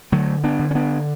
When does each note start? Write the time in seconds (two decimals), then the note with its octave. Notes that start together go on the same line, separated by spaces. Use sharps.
0.12 D3 F#3 A3
0.44 B3 D4
0.59 D3
0.71 C#4
0.75 B3 D4